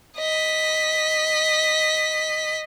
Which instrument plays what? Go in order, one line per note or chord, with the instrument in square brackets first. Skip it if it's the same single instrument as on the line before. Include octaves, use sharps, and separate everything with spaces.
[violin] D#5 B6